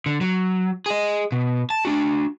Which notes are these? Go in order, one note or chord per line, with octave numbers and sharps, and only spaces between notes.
D3
F#3
G#4 D#5
B2
A5
D4 F#4